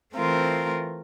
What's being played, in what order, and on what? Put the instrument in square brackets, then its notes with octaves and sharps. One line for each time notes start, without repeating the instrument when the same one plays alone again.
[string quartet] E3 A3 C4 F4 A#4